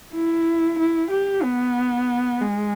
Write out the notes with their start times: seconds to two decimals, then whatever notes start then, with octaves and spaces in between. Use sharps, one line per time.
0.13 E4
0.79 E4
1.10 G4
1.43 B3
2.41 G#3